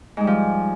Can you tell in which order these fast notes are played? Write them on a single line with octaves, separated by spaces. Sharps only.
G#2 G#3 G3 F3